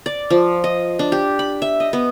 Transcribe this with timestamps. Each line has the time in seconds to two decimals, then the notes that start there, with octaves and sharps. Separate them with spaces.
0.06 D5
0.30 F3
0.64 D#5
0.99 D4
1.12 G4
1.39 B5
1.62 E5
1.80 D#5
1.93 B3